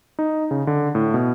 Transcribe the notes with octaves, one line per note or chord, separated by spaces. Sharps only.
D#4
C#3
D3
A2
B2